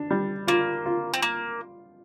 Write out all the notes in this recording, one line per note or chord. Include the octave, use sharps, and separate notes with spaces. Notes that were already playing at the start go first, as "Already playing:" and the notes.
Already playing: D4
G3
A#3 F4
F4
C4
A#3